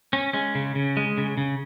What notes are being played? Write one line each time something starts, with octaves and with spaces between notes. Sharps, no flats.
C#4
G#3 C#4
C#3
C#3
G#3
C#3
C#3